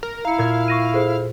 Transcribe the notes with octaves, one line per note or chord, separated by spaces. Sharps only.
A#4
E4 F5 A#5 C#7
A#2 G#6
C#6 A#6 D#7
G#4 A4 C5